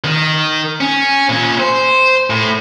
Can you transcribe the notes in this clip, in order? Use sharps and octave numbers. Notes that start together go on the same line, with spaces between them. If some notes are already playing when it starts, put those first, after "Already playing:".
D#3
C#4
A#2 C#4
C5
A2